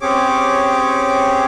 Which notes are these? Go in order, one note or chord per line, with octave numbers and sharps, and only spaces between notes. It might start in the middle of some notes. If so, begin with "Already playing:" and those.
C4 C#4 G4 G#4 C#5 D6